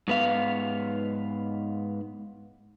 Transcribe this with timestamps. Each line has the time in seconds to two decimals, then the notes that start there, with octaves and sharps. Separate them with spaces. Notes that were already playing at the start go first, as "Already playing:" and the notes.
0.08 G#2 B3 F5